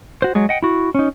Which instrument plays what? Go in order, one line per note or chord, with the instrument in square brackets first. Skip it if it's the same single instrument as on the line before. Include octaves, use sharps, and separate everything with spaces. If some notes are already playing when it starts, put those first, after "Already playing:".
[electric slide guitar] F#4 C5
F#3 G#3 G#4
D#5 F#5 G5
E4 F#4
C#4 D#4